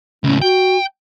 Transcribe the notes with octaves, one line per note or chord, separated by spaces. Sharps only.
C#2 A2 C#4
F#4 G5